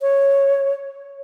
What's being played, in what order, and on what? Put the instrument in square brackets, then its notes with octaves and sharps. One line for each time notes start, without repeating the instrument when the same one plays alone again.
[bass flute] C#5